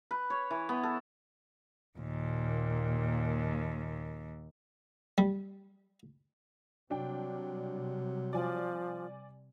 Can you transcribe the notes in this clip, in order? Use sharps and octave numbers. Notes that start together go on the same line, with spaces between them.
B4
C#5
E3
B3
A4
D#2 A#2
G3
C3 F#3 G3 D4 G5
F3 D5 G#5